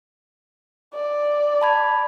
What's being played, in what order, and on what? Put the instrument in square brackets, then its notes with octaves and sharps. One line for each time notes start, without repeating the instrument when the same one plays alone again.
[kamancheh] D5
[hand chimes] A5 B5 G#6